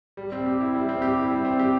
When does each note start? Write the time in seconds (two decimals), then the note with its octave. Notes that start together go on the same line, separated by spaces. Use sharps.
0.17 G3
0.32 C4
0.46 G4
0.61 E4
0.75 G3
0.89 C4
1.02 G4
1.17 E4
1.30 G3
1.45 C4
1.59 G4